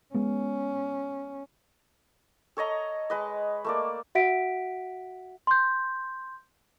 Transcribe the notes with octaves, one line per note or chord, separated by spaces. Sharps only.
G#3 B3 C#4
A4 C#5 D#5 A#5
G#3 B4 D#5
A3 A#3 D5
F#4 E5 F#5 B6 D7
C6 G6